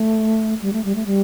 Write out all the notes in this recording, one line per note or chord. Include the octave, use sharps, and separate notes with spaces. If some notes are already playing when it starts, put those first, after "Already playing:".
Already playing: A3
G3
A3
G3
A3
G3